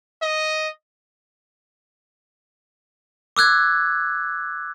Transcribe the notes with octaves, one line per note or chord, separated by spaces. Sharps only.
D#5
D6 E6 F#6 G#6